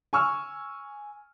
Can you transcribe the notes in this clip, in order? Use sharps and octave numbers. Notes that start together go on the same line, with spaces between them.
G#5 C#6 E6 F6